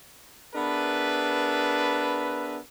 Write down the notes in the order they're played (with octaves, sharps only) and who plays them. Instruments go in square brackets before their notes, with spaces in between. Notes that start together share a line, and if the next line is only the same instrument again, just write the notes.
[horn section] B3 D4 G#4 A#4 B4 E5